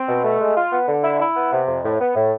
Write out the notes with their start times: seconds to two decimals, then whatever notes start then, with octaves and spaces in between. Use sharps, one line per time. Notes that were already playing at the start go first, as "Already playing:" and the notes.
Already playing: C4
0.08 B2
0.24 A3
0.40 G#3
0.56 F4
0.72 B3
0.88 D3
1.03 E4
1.20 E4
1.36 B3
1.52 C3
1.68 F2
1.84 A2
2.00 B3
2.15 A2